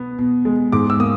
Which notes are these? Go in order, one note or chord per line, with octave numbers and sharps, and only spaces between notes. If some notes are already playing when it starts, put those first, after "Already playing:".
Already playing: B2 B3
B2
G#3
G#2 D6
E6
A#3 D#6